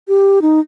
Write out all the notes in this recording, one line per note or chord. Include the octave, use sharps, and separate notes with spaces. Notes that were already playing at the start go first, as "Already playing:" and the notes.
G4
D#4